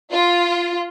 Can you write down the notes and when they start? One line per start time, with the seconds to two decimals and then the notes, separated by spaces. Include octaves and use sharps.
0.12 F4